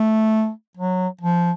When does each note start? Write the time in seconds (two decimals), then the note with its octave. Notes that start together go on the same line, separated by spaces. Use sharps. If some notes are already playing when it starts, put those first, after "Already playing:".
Already playing: A3
0.77 F#3
1.21 F3